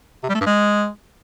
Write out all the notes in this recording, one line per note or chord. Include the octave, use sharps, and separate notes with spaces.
C3
G3
A3
G2
G#3